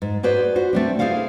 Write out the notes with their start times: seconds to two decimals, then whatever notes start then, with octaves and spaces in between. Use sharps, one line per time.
0.02 G#2
0.23 F#4 G#4 B4 C5 D5
0.56 F#4 C5
0.73 A3 C4 D4
0.99 E4 G#4 A4 C5 F5 F#5